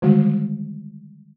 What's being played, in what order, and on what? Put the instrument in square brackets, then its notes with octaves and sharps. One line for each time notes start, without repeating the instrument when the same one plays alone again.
[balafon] D3 D#3 G3 G#3 F#4